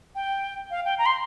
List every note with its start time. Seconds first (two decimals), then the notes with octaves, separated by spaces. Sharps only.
0.15 G5
0.71 F5
0.85 G5
0.98 A#5
1.06 C6